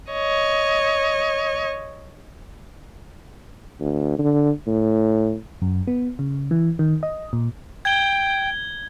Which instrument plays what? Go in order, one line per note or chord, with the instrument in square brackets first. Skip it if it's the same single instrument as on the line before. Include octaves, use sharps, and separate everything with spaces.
[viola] C#5 D#5
[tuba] D2
D3
A2
[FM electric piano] F#2
B3
C#3
E3
D#3
D#5
A#2
[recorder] G5 [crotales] G#6 G7